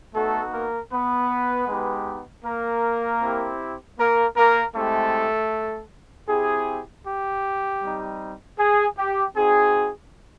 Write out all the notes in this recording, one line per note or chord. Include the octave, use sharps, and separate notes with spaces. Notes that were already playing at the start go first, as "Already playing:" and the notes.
A3 B3 D#4 F#4 A4
A#3 A#4
B3 B4
G#3 B3 D#4 G4
A#3 A#4
C4 E4 G4
A#3 A#4
A#3 A#4
G#3 A3 C4 E4 G4 A4
C4 E4 G4 G#4
G4
G3 C4 D#4
G#4
G4
C4 D#4 F#4 G#4